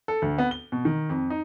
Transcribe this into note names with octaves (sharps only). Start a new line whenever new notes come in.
A4
D2
B3
G7
B2
D#3
F2
D#4